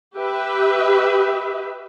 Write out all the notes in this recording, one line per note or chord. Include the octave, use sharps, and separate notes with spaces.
G4 B4 E5